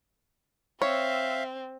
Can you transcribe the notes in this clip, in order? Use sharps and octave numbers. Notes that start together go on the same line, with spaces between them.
C4 C#5 E5 F5